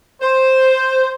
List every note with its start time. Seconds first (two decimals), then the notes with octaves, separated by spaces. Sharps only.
0.21 C5